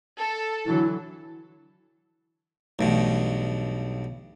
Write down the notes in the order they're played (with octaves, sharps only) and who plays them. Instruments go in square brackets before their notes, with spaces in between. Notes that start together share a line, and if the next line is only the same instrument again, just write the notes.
[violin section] A4
[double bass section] D3 E3 F#3 [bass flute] E4
[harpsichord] B1 G2 B2 [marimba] E3 A3